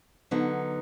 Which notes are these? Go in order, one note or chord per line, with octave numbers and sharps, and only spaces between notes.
D3 F#3 B3 D#4